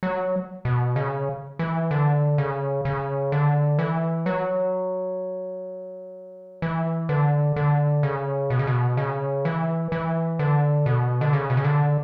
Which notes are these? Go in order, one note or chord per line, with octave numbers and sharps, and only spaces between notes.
F#3
B2
C#3
E3
D3
C#3
C#3
D3
E3
F#3
E3
D3
D3
C#3
B2
C#3
B2
C#3
E3
E3
D3
B2
D3
C#3
B2
C#3
D3